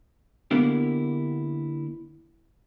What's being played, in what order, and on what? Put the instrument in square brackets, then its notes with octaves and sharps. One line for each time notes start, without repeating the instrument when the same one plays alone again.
[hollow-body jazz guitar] D3 A#3 B3 E4 G4